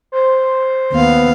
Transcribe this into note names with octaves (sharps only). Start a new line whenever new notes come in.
C5
D#2 B3 F5